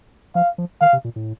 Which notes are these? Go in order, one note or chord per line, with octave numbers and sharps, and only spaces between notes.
F3 F5
F3
D#3 F5
C3
A#2
A2